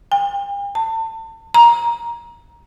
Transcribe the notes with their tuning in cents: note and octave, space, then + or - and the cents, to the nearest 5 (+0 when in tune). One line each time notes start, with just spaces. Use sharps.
G5 +45
A5 +35
A#5 +15